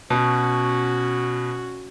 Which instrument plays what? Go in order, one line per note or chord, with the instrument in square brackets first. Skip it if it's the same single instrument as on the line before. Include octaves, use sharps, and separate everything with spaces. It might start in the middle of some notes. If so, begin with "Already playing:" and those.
[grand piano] B2 [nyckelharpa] C#4 F#4